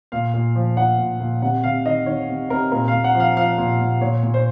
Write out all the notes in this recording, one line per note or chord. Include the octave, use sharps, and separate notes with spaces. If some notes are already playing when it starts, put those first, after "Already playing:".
A#2 F5
A#2
F3
F3 F#5
A#2
A#2
C3 F#5
C3 F5
D#3 D#5
D#3 C#5
C3
C3 A#4
A#2 A#4
F5
A#2
F#5
F3
F5
F3 F5
A#2
A#2
A#2 C#5
A#2
C5